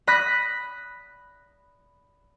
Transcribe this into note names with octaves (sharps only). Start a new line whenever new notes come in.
B5 D#6 F#6 A#6 B6